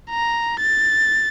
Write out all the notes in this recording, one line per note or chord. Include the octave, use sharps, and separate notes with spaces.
A#5
A6